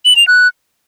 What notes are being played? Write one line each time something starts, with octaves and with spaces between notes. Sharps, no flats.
F#7
F7
F#6